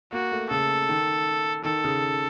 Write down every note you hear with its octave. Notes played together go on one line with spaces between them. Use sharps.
A#3 F#4
A3
C#3 A4
D#3
D#3 A4
C#3